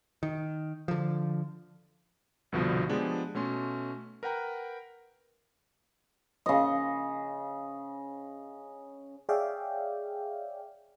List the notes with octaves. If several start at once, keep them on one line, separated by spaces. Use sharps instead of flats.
D#3
D3 F3
C2 G2 B2 D3 F3 B3
F3 G#3 B3 D4 G4 G#4
B2 A3 C#4 C6
A#4 B4 F#5 G5 A#5
C#3 D#5
G#4 C#5 D5 E5 F5 G5